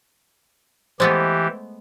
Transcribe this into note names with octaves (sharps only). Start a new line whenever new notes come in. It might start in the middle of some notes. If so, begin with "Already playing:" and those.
E3 G#3 A3 B3 G4 C5